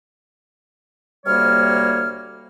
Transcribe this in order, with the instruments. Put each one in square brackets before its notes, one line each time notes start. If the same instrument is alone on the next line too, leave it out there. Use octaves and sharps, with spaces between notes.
[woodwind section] D2 C3 G3 A#3 C#5 F6